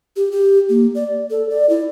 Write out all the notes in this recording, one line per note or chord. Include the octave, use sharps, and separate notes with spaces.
G4
G4
A#3
D5
A4
D5
E4